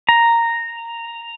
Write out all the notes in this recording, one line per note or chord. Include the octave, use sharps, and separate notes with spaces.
A#5